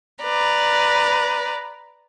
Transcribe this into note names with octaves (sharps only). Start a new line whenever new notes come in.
B4 D5 A#5